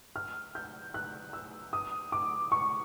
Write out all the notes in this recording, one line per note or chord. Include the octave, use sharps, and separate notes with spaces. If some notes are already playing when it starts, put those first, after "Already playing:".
F6
G6
F#6
E6
D#6
D6
C#6